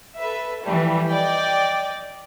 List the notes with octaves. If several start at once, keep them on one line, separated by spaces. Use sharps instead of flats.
A4 B4 E5
E3 F3 G3 A3
D5 D#5 G5